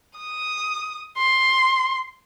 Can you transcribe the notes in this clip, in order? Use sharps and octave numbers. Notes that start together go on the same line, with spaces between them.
D#6
C6